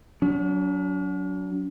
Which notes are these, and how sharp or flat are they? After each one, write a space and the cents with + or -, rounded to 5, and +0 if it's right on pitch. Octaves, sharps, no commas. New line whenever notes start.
F#3 +0 D4 -45